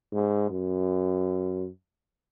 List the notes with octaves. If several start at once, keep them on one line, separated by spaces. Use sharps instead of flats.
G#2
F#2